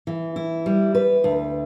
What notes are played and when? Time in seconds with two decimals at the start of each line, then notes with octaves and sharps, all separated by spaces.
0.07 E3
0.36 E4
0.66 G3
0.95 B4
1.24 D2